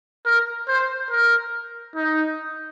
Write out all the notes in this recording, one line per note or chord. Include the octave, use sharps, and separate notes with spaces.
A#4
C5
A#4
D#4